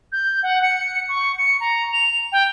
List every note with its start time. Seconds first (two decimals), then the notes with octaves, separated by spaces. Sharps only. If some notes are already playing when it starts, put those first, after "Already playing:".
0.12 G6
0.42 F#5
0.62 C#7
1.08 C#6
1.38 C#7
1.60 A#5
1.93 F7
2.32 G5